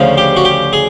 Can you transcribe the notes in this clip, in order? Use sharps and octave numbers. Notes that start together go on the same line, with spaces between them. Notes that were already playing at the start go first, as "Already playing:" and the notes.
Already playing: D2 C#3 F3
G4
F#4
G4
G#4